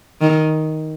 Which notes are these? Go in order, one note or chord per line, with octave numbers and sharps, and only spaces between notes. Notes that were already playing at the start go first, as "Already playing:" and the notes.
D#3